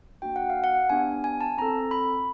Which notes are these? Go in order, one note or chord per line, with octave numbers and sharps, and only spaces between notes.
A#3 D4 F#4 G5
F#5
F5
F#5
B3 D4 G4 G#5
G#5
A5
C4 E4 A4 A#5
B5